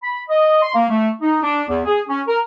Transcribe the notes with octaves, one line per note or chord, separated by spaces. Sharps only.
B5
D#5
C6
A#3
A3
D#4
D4
E2
G#4
C#4
A#4